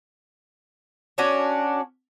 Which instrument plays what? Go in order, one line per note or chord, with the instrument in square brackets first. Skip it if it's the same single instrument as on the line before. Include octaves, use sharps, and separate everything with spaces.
[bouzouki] C#4 D4 F#4